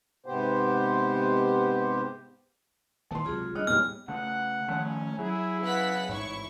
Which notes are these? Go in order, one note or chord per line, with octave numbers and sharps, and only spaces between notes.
G#2 C3 B3 G4 C5
D#1 D#2 E3 A5 C6
C#2 C3 F#3 F4 G#4
G3 D4 C#5 D#5 F6 F#6
E2 A2 G3 A#3 B3 F6
C#3 A3 F#5
D#3 F3 A3 C#4
F#3 E4 G#4
C#3 B3 F#5 B6
A1 G#2 E4 C#5 C#6